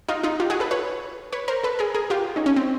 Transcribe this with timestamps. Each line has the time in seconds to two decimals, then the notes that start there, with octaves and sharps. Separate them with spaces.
0.08 D#4 F4
0.23 D#4 F4
0.40 F4 G4
0.50 F#4 G#4
0.60 A4 B4
0.71 B4 C#5
1.33 B4 C#5
1.48 A#4 C5
1.63 A4 B4
1.79 G#4 A#4
1.94 G#4 A#4
2.10 F4 G4
2.36 C#4 D#4
2.46 C#4
2.56 C4